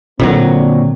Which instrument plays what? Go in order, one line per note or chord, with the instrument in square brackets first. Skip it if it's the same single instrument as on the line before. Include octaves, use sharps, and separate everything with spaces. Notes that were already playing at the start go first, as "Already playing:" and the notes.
[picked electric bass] A#2 D3 F#3 [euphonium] C4